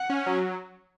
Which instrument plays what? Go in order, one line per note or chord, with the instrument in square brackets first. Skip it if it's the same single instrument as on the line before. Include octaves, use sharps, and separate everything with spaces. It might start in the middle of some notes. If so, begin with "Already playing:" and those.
Already playing: [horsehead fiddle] F#5
[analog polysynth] C#4
F#3